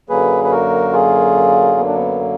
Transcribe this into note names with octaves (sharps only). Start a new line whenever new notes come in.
F#2 D3 F#3 A#3 G#4 B4
B4
F#4 A#4
F4 G#4
B3
D4
B3